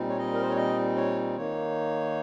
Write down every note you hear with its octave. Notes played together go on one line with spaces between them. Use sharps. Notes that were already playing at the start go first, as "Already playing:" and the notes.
Already playing: A#2 G3 C4 D#4
C#5
D#5
A#4
C5
C#5
D#5
C#5
D#3 A#3 D#4 C#5